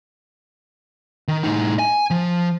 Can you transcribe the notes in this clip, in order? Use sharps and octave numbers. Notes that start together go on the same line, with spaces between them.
D#3
A2 D#4
G#5
F3